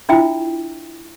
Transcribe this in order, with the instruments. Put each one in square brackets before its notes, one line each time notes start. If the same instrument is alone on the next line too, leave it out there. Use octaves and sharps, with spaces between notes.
[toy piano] D4 E4 F4 E5 G5